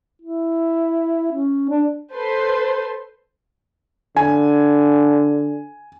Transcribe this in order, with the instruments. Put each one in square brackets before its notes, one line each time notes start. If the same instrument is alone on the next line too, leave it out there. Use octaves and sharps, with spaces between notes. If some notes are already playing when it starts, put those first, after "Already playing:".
[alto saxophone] E4
C#4
D4
[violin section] A4 B4 C5 C6
[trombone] D3 [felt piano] G#5